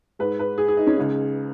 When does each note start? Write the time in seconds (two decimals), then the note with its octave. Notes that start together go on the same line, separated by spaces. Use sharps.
0.19 G#2 G#3 B4
0.39 B4
0.58 G#4
0.68 G#4
0.77 D#4
0.87 C#4
0.97 C#2 C#3 G#3 D#4